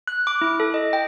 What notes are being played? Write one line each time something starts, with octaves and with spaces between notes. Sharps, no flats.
F#6
D6
E4
A4
D#5
G5